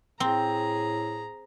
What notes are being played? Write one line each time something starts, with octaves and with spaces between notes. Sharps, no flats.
A2 C4 G#4 A#5